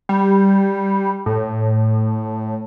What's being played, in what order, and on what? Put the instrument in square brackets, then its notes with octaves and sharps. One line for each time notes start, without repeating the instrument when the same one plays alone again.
[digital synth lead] G3
A2